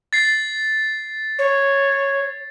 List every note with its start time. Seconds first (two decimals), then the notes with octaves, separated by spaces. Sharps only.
0.13 A6 C7
1.39 C#5